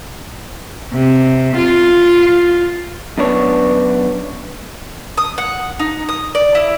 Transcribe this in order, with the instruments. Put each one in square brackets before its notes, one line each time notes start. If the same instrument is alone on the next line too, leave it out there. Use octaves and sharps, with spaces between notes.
[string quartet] C3
F4
[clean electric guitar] F#2 B3 D4 A#4 C#5
[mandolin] D#6
F#5
D#4
D#6
D5
E4